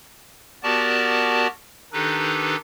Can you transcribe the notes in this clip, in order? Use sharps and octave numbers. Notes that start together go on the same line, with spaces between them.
B3 F#4 G4 A#4 D5 A5
D#3 D4 D#4 G4 A4 B4